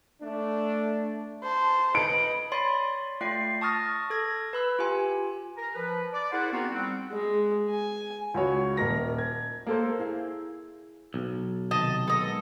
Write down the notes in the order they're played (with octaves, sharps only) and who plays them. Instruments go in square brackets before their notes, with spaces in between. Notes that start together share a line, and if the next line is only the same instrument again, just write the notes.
[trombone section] A3 D4
[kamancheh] C5 A5
[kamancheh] B4 D#5 [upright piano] D7
[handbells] C#5 D5 B5 C6 A6
A3 F4 D5 G5 C7
A5 C#6 D#6 F6 A6 A#6
A4 G#6 A#6
B4 B5 E6
F4 G4 G#5
[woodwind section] A#4 A#5
F3 B4
D5
E4 G#4 A#4 C5 F#5
B3 C4 D#4 F4 F#4
G3 C4 F#5
[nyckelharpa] G#3
G#5
[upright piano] C#2 F#4 C#5
D#1 A#4 A#6
G#6
A#3 A4 C5
[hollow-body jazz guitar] E4 G#4 F5
[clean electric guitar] B1
[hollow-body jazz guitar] C3 D#3 [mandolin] D#5 A5
[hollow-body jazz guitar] G#3 B3 A#4 [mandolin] A4 D#5